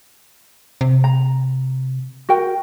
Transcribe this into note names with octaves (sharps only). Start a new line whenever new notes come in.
C3
A#5
F#4 A#4 G5